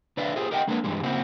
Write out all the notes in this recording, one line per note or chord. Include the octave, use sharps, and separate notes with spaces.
D3 B4 D5 E5 F5
F4 G4 G#4 C5
G4 A#4 D#5 E5 F#5 G5
G#3 A#3 D4 A#4 B4 C#5
G2 E3 G3 G#3
C#3 A#3 C4 E4 F#4